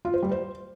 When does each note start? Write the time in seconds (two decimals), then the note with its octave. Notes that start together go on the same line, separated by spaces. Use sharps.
0.05 F4
0.14 C5
0.23 G3
0.31 C5